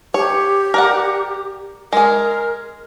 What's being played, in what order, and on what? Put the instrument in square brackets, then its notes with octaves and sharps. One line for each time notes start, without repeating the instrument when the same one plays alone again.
[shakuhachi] G4 [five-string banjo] C#5
[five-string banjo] A#4 D5 F#5
[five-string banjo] G#3 G#4 [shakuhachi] A#4